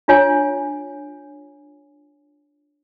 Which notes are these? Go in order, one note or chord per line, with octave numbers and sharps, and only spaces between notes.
D4 F4 C#5 G#5